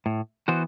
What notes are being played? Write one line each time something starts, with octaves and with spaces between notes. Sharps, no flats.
A2
E3 B3 F#4 C5